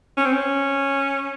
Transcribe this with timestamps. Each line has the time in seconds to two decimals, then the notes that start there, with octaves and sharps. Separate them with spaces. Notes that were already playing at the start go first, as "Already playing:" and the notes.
0.17 C#4
0.25 C4
0.33 C#4